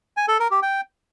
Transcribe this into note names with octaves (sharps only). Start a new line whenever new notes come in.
G#5
A4
A#4
G4
G5